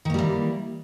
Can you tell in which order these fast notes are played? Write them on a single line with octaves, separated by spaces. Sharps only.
D#3 A#3 G3 E3